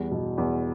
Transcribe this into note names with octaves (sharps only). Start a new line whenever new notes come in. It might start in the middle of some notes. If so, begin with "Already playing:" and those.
Already playing: E2 G3
B2
E2